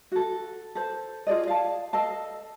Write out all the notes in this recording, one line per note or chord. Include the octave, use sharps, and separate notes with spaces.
F#4 A4
A4 C5
F4 G#4 D5 D#5
F5 A5
A4 D#5 F5 A5